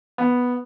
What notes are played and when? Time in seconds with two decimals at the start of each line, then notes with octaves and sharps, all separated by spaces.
0.18 B3